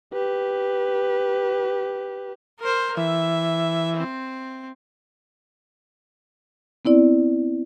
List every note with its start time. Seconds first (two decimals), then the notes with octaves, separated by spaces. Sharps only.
0.13 G4 B4
2.59 A#4 C5
2.97 E3 E5
3.96 C4
6.85 B3 C4 E4 D5